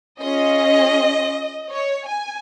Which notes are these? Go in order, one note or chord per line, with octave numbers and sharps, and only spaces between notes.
C#4 F4 G#4 D#5
C#5
G#5